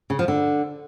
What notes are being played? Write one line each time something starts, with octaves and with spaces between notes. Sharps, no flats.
C#3
F3
D3